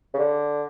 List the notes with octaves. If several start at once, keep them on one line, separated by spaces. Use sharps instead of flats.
C#3
D3